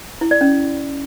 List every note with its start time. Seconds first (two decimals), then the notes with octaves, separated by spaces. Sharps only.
0.21 E4
0.31 D5
0.41 C#4